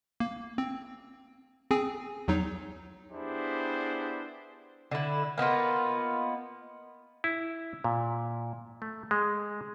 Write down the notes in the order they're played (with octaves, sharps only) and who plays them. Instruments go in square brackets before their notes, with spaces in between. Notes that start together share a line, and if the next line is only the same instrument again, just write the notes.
[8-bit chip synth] A#3
C4
C4 G#4 G#5
E2 F#3 D#4
[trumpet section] B3 D4 E4 G4 G#4 C5
[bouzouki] D3 E4
A#3 B3 D#4 F4
[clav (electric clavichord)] E4
A#2
A3
G#3